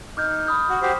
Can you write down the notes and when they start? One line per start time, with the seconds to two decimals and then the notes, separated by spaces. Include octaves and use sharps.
0.17 D#4 D6 F6 G6
0.47 B5 D#6 G6
0.69 F#4
0.82 F#4 G4 C5